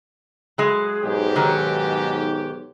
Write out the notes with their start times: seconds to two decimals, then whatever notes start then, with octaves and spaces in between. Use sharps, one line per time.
0.58 F#3 G#3
1.03 B1 G#2 G4
1.36 D#3 F#3